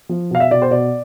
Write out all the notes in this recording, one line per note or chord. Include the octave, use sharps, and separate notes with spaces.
F3
B2 F5
E5
B2 D5
C5
B2 D5